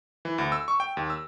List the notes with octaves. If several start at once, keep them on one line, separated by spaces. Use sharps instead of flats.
E3
D2
E6
C#6
G5
D#2
E6